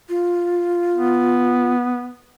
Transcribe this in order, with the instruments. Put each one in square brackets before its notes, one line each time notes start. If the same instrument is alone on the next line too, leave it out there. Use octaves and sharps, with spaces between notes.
[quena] F4
[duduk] B3